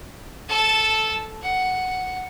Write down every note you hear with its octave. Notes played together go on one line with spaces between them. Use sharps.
A4 A5
F#5